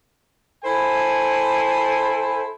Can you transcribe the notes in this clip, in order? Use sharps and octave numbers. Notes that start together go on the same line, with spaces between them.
E4 A4 C5 G#5